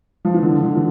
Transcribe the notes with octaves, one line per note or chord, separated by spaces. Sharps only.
F3
E3
D3
D3
E3